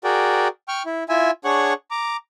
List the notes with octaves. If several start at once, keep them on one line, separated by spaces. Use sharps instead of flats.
F#4 G#4 A#4 D5 G5
G5 C#6 F6
E4
E4 F4 E5 G#5
D4 G#4 C#5 F#5 C#6 F#6
A#5 D6